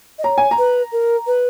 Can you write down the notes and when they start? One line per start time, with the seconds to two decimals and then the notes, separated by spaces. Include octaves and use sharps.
0.19 D#5
0.24 C#5 A#5
0.38 G#5
0.51 A#5
0.58 B4
0.92 A#4
1.27 B4